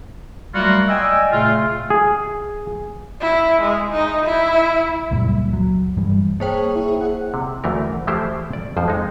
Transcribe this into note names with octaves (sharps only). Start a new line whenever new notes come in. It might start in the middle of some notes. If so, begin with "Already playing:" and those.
F#3 G3 A3 A#3 F4 F#4
D5 D#5 G5 G#5 E6
A#2 C#3 A3 F4
G#4
E4
G#3
D#4
E4
C#2 F#2 A#2 G3
F#3
G2 E3 G3
A#3 G#4 C5 C#5 G5
E4
F#5
C3
D2 E3 A3 A#4
E3 F3 A3 E4 G4 C5
D5
F2 F3 C5
G#3 D#4